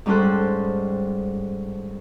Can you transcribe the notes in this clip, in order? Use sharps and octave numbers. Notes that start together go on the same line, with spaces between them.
G#2 G3 C#4 A4 C5 F#6